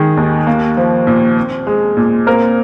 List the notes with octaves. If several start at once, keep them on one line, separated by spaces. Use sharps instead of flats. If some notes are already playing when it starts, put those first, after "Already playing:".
Already playing: D#3 G#3 G#4
D#2
A#3
F3
A#2
C4
G#3
A#2
A#3 C4 A#4